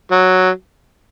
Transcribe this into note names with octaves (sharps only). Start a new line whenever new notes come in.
F#3